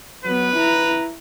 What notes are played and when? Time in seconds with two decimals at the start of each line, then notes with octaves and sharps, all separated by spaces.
0.25 F#3 B3 B4
0.57 E4 A#5